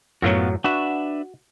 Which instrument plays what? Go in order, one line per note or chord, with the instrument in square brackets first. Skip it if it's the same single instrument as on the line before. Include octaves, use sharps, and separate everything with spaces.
[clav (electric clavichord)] F#2 A2 F#3 [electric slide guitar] B3 F4 F#4
[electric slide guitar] D4 B4 E5 [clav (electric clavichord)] F#4